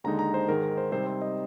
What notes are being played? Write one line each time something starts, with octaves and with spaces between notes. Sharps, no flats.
D#2 D3 G#3 D#4 A#5
A#5
C5
G#2 D#3 G#3 A#4
A#4
C5
C3 G3 C4 D#4 C5
C5
D#5